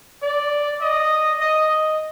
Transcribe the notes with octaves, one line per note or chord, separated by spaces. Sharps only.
D5
D#5
D#5